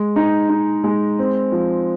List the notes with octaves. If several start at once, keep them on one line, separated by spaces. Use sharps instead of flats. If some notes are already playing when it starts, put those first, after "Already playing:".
Already playing: G#3
D#4
D#4
G#3
C4
F3